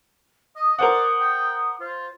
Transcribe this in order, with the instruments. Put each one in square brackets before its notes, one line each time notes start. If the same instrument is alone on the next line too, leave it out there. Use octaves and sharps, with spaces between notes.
[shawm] D#5 [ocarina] D#6
[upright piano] A#4 C5 F#5 [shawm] D5
[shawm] G5
[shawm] F4 [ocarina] C5